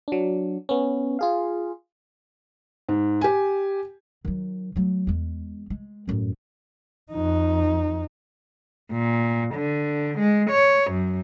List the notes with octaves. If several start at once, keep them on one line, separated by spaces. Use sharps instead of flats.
F#3 D4
B3 C#4
F4 G#4 F5
G#2
G4 G#5
D#3 F#3
F#3 A3
E2 G#3
G#3
F#2 A2
F2 D#4
A#2
D3
G#3
C#5
F#2